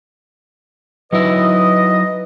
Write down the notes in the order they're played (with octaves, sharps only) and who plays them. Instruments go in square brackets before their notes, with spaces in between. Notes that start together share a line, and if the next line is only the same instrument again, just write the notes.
[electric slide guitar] F#3 D#4 E4 [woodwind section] B4 D#5